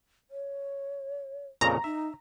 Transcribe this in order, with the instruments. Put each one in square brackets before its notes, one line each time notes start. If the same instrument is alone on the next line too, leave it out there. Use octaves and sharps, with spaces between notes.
[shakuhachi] C#5
[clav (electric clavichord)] F2 A#2 C#3 [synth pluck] A#5
[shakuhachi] D#4 [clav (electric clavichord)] E5